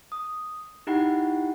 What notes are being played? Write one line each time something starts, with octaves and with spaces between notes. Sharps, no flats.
D#6
D#4 E4 G4 F#5 G5 B5